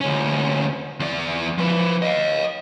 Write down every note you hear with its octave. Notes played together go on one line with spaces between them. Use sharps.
D2 C#4
E2 D5
F3 B4
D#5 F5